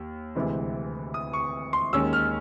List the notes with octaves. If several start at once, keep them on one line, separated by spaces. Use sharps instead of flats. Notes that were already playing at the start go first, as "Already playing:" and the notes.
Already playing: D#2
D2 C3 E3 G#3 C4
D#6
C#6
C6
D#2 D#3 G#3 C#4 E6
F6